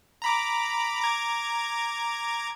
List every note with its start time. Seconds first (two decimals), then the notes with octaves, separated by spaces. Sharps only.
0.22 A#5 B5 D6
1.00 A#5 D6 G#6